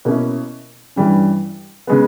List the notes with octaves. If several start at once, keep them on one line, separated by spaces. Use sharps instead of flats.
B2 A#3 C#4 E4
G2 E3 G3 C#4
C#3 G#3 B3